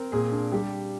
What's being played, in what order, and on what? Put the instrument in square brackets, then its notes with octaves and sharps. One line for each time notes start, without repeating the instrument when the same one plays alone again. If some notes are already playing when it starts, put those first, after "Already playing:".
Already playing: [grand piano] C4 [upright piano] A#4
[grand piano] A#2 [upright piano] G#4
[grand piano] D4
[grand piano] G3 [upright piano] G4